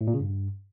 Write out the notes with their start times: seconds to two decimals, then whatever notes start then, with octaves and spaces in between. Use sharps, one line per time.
0.01 A2
0.07 A#2
0.14 C#3
0.20 G2